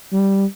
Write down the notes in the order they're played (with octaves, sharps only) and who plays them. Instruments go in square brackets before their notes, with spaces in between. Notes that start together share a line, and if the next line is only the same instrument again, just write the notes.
[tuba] G3